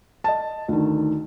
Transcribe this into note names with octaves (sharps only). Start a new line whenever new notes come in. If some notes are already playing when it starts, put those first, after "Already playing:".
D#5 A5
D2 D#3